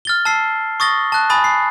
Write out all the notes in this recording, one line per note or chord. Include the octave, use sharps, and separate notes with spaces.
F6 A6 G7
A5 E6 C7
C#6 D#6 A6 A#6 G7
A5 F#6
G#5 B5 D#6 A6
C7